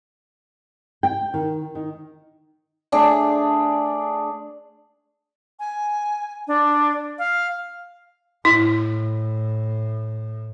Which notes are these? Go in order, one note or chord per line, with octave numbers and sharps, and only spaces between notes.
G5
D#3
D#3
A3 D4 G#4 D5
G#5
D4
F5
A2 E4